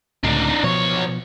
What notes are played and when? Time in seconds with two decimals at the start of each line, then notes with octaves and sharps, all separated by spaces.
0.23 C#2 A2 D3 D4 D#4
0.63 B1 B2 F3 C#5